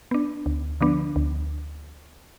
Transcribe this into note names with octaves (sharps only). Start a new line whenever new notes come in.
B3 D4
D2
D3 F3 B3 D4
D2